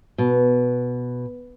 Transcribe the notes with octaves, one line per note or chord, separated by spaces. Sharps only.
B2